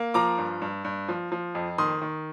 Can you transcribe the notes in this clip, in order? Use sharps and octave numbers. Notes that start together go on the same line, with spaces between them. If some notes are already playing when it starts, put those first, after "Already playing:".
Already playing: A#3
F3 A#5 D6
G2
G2
G2
F3
F3
F2
D#3 C6 D#6
D#3